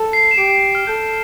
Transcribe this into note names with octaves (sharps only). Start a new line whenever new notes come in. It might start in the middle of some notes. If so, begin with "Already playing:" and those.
Already playing: A4
C7
E7
G4 D7
C7
F6
A4 G6